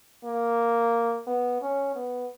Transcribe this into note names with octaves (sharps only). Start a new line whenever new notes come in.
A#3
B3
C#4
B3